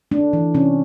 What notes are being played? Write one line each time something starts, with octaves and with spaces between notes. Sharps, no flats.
A3 D4
E3
C3 C#4